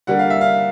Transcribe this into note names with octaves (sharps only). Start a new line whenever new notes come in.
D3 G3 A#3 F#5
F5
E5
F5